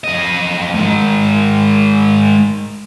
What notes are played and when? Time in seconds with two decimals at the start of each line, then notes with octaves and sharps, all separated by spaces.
0.04 F2 D#5
0.74 G#2 D#3